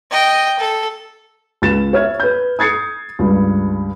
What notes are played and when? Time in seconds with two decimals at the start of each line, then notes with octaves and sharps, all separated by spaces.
0.11 D#5 G5
0.60 A4
1.62 C#2 A6 E7
1.93 C#5 E5 F6 G#6
2.20 B4 G6
2.59 D#6 G#6 A6 C7 C#7
3.19 C#2 G2